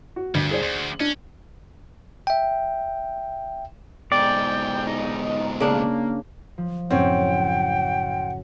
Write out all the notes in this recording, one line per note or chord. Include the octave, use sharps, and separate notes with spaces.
F#4
D2 G2
G#4 C5 D5
D2
C#4 D4
E5 G5
G#2 B2 D5 G5
D#4
C#3 A#3 D4
F3
F#2 A2 C#3 C4 C#4 F#5 G5